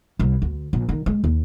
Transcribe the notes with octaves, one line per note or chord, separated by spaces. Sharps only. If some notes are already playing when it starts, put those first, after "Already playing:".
C2
D2
A#1
D#3
G#3
D#2